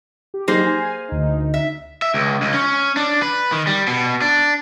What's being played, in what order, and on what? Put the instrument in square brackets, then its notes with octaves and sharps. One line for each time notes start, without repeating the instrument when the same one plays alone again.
[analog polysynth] G4
[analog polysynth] F#3 D#4 G4 [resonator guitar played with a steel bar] A#3 G#4 C5
[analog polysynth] G#5
D2 D#4
[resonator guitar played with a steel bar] E5
[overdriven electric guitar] E5
C#2
C#2
C#4
D4
B4
D#3
G3
B2
D4